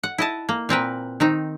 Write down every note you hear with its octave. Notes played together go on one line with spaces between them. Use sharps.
F#5
E4 D#5 A5
A#3
A#2 C4 A#4 B4
D#3 C4 D#4